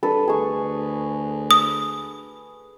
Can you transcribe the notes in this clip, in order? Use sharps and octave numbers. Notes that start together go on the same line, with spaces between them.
G2 A4 B4
D2 G#4 C#6
D#6